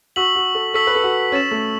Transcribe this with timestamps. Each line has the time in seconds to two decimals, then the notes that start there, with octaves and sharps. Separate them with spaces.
0.16 F#4 C#6 E6 B6 F#7
0.36 F#4
0.55 A4
0.74 A4 C#6 E6 B6 F#7
0.87 B4
0.95 A4
1.03 F#4
1.32 C#4 E6 A6 E7
1.51 A3